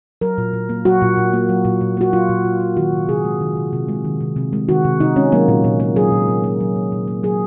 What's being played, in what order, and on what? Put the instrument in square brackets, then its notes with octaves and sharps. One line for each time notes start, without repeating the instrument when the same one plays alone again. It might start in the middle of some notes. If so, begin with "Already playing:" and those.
[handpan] F#3 A#4
A#2
A#2
A#3
F#3 F#4
A#2
A#2
A#3
F#3
A#2
A#2
A#3 F#4
F#3 F4
A#2
A#2
A#3
D#3 F#4
C3
C3 G#4
G#3
D#3
C3
C3
G#3
D#3
C3
C3
G#3
D#3 F#4
C3
C3 D#4
G#3 C#4
F#3 A#3
A#2
A#2
A#3
F#3 G#4
A#2
A#2
A#3
F#3
A#2
A#2
A#3
F#3 G#4